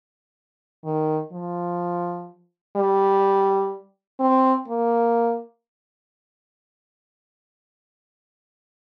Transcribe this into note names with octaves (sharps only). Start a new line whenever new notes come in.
D#3
F3
G3
C4
A#3